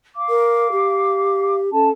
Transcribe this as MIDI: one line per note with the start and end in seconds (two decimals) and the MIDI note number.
0.15 1.56 77
0.15 1.56 86
0.29 0.68 70
0.72 1.70 67
1.72 1.90 61
1.72 1.90 69
1.72 1.90 81